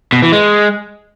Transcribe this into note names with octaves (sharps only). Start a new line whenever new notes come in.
B2
E3
G#3